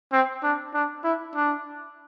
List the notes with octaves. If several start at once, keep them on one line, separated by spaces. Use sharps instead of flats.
C4
D4
D4
E4
D4